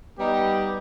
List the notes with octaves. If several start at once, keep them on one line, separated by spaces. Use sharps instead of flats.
G3 B3 D#4 G4